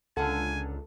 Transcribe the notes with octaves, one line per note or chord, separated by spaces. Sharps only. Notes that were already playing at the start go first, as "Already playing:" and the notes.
C#2 A#2 D3 A4 F#5 G#5